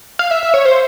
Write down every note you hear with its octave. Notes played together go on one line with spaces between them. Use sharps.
F5
E5
E5
C#5
C5